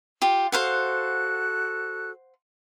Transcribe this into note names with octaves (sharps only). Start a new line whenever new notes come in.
F4 G4
F#4 A4 C5 F5 F#5 F#6